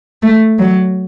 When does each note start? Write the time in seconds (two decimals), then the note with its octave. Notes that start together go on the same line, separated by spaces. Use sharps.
0.23 A3
0.59 F#3